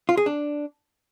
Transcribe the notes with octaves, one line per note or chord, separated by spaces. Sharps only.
F4
G#4
D4